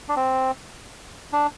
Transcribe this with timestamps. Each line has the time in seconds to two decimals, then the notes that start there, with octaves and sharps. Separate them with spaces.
0.09 D4
0.16 C4
1.33 D4